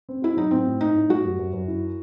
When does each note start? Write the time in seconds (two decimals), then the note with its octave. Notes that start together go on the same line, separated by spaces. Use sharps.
0.09 C4
0.22 E4 F#4
0.37 F#3 D#4
0.51 A2 C4
0.66 A2
0.80 A2 D#4
0.95 A2
1.09 G3 F#4
1.24 F#2
1.38 F#2
1.53 F#2
1.68 E4